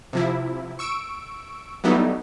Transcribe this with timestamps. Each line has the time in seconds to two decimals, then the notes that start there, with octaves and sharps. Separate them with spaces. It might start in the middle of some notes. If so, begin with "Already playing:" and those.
0.13 C3 F3 E4
0.79 C#6 E6 D7
1.84 F#3 G3 A3 B3 D#4 E4